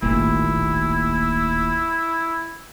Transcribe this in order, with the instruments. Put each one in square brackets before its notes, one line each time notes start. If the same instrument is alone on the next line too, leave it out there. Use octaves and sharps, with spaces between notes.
[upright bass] D1 G#1 [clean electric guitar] D#2 A#2 [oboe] E4